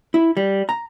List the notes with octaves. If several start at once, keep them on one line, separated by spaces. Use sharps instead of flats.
E4
G3
A#5